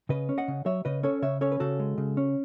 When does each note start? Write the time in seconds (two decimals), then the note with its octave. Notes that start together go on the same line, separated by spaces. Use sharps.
0.09 C#3 B4 D#5
0.29 C#4
0.38 D#5 F#5
0.48 C#3
0.66 F#3 C#5 E5
0.85 C#3 B4 D#5
1.03 C#4 A4 C#5
1.22 C#3 C#5 E5
1.41 C#4 A4 C#5
1.52 B4
1.60 C#3 F#4 A4
1.80 G#3
1.98 C#3
2.17 C#4